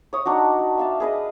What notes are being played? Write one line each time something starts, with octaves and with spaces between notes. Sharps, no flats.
C#5 D#6
D4 D#4 F#4
F#4
E5 F5 A5
G#4 B4 D#5